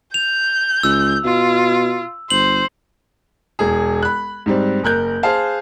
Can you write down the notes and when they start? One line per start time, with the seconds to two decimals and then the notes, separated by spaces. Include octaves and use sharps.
0.14 G6 F7
0.83 C#2 E6
1.24 B2 F4
2.30 G1 C5 F#7
3.59 E1 G#4
4.03 B5 F#6
4.46 G#2 G3 C4
4.83 F#1 A#4 F#6 G6
5.23 G#4 C5 F5 A5